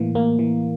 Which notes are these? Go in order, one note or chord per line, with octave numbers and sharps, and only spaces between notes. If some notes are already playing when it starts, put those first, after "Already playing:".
Already playing: A2 E3 A#3
A2 A#3
E3